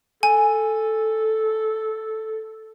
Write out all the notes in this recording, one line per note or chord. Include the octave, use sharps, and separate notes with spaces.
A4 G#5